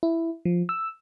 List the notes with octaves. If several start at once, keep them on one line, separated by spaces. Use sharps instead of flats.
E4
F3
E6